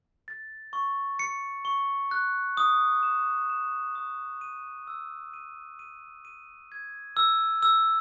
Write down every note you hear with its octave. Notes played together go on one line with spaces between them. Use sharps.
A6
C#6
C#7
C#6
F#6
D#6
E7
E7
D#6
D#7
E6
D#7
D#7
D#7
G#6
E6
E6